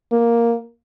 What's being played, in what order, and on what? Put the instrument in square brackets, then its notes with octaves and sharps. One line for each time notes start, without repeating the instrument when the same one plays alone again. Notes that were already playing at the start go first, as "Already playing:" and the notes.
[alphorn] A#3